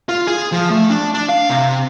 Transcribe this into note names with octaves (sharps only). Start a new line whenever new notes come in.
F4
G#4
F3
A3
D4
D4
F5
C3